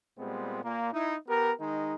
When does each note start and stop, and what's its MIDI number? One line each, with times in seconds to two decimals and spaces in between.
0.19 0.63 46
0.19 0.63 55
0.19 0.63 56
0.19 0.63 59
0.19 0.63 60
0.63 0.92 46
0.63 0.92 58
0.93 1.15 63
0.93 1.15 64
1.28 1.52 59
1.28 1.52 67
1.28 1.52 70
1.59 1.94 51
1.59 1.94 56
1.59 1.94 63